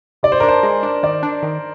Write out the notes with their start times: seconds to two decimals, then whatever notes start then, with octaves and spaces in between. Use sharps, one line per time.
0.23 C3 D5
0.32 C5
0.40 D4 A#4
0.49 C5
0.63 G#3
0.83 D4
1.03 D#3 D5
1.23 D4
1.43 D#3